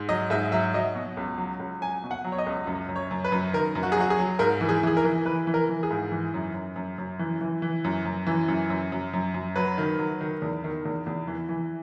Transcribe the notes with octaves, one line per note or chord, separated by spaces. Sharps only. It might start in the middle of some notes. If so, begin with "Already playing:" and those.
Already playing: G#2
F#3 D#5
G#2 E5
F#3 E5
F#3 D#5
B2
C#2
F#3
C#2
F#3 G#5
B2
F#5
F#3
C#5
D#5
C#2
F#2
F#2
C#5
F#2
B4
F#2
D#3 A#4
F#2
F#4
G#4
F#3 F#4
G#4
F#3
G#2 A#4
E3
G#4
E3 G#4
A#4
E3
E3 B4
E3
A#4
E3
G#4
G#2
E3
F#2
F#2
F#2
F#2
E3
E3
E3
F#2
F#2
E3
F#2
F#2
F#2
F#2
F#2
F#3 B4
D#3
F#3
D#3
E2
D#3
E2
E2
E3
E3